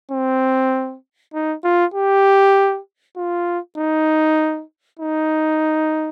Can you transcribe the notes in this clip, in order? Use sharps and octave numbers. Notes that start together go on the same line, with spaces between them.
C4
D#4
F4
G4
F4
D#4
D#4